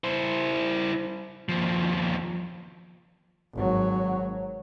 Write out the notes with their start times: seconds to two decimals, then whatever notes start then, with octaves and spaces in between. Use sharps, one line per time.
0.04 E4 C5
1.49 D#2 F3
3.53 G#1 F#3